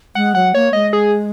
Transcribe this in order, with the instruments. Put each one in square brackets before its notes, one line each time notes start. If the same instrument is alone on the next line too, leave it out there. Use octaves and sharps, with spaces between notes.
[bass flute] G#3 [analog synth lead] F#5
[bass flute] F#3 [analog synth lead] F#5
[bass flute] A#3 [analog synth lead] C#5
[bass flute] G#3 [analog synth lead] D#5
[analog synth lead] G#4